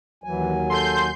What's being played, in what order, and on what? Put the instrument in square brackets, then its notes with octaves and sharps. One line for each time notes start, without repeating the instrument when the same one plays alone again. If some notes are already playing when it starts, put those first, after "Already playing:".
[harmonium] D#2 F#3 G#5 [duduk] E3
[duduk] A4 [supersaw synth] C6 G6